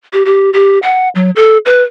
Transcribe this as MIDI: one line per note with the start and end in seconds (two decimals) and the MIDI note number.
0.13 0.23 67
0.26 0.50 67
0.53 0.78 67
0.83 1.09 78
1.15 1.30 54
1.36 1.58 69
1.66 1.83 71